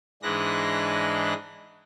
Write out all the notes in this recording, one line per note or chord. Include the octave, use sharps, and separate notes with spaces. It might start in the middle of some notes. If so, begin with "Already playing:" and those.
G#2 E3 G#3 D4 F#6 A#6